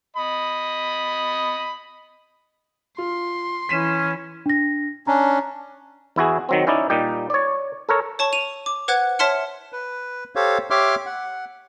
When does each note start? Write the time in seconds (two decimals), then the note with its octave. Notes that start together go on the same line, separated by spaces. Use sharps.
0.16 D#5 B5
2.98 F4 C6
3.69 E3 C#4 E4 B6 D#7 E7
4.46 D4 A#6
5.07 C#4 D4 A#5
6.16 E2 E4 F#4 G#4
6.49 D#3 F#3 C4
6.67 C#4 D#4 E4 D5
6.90 A#2 G3 D#4 G4
7.30 C#5 D5
7.89 A4 A#4 C#5
8.19 C#5 A5 C#6
8.33 D#7 F7
8.66 D6
8.88 B4 C5 F#5 F#6 G#6
9.19 C#5 E5 A5 C6 F6 C#7
9.73 B4
10.36 G4 A4 C5 C#5 F5
10.70 G4 C#5 E5 C6 D6 F6
11.06 F#5